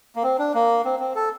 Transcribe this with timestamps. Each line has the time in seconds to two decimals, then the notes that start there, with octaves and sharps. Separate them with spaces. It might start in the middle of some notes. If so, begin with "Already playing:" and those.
0.16 A#3
0.23 C4
0.39 D4
0.54 A#3
0.85 C4
0.99 C4
1.15 A4